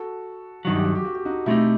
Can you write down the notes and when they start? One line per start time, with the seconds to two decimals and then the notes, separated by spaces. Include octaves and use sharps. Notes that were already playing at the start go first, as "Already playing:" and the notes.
Already playing: F#4 A4
0.65 G2 D#3 F#3 F#4
0.75 G4
0.85 F#4
0.95 G4
1.05 F#4
1.15 G4
1.25 D#4 F#4
1.46 B2 A3 C4 D#4 E4 G4